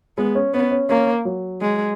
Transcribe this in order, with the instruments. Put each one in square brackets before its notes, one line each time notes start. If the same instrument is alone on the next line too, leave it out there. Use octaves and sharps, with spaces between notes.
[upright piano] G#3 [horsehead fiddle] B3
[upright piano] C#4
[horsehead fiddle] B3 [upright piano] C#4
[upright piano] C#4
[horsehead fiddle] A#3 [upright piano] C#4
[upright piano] F#3
[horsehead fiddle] G#3